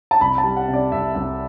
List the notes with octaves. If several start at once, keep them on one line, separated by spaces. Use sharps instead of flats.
A5
C2 B5
A5
G3
F#5
C3
D5
C2 E5
C2 E5